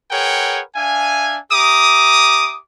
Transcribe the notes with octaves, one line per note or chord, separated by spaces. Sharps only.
G#4 A#4 B4 C#5 F#5 G5
D4 E5 F5 G#5
G4 E5 A#5 D6 D#6